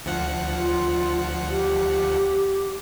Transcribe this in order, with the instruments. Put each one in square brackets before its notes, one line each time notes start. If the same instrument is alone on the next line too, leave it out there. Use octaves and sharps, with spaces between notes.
[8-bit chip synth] D2 F3 F#5
[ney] F4
G4